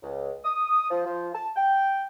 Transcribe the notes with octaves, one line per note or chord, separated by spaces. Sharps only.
C#2
D#6
F3
F3
A5
G5